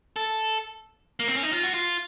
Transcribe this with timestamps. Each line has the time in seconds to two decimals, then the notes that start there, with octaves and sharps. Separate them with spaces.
0.16 A4
1.20 A#3
1.28 C4
1.35 C#4
1.43 D#4
1.52 F4
1.63 F#4
1.74 F4